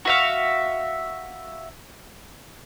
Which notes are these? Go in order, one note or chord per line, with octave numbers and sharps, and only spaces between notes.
F#4 E5 F5